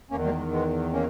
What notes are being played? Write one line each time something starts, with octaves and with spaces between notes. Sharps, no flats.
E2 D#3 A#3 C#4
G3 A#3
G#3
G#3 B3
A#3 C#4